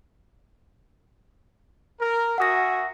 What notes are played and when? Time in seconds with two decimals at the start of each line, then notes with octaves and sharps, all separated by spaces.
2.01 A#4
2.38 F#4 E5 F#5 G#5 D#6 A#6